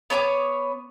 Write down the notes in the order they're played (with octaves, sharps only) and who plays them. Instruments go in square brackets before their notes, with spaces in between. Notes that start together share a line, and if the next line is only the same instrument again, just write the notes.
[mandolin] B3 C#5 B5 D6